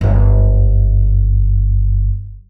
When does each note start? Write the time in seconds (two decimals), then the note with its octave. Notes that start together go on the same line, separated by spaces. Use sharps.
0.01 G1 F#2